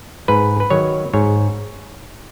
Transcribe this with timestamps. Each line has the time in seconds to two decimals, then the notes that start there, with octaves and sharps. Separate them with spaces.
0.28 G#2 B4
0.60 B4
0.70 D#3 F#3 C#5
1.13 G#2 C#5